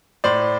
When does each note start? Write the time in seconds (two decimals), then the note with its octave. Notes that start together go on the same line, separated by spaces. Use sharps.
0.24 A2 C5 D5